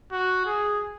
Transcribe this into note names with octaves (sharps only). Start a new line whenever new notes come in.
F#4
G#4